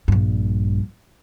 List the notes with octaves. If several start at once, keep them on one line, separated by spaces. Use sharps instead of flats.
A#1 G2